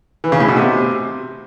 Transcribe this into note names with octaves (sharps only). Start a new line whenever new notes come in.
E3
C#3
A2
B2
C3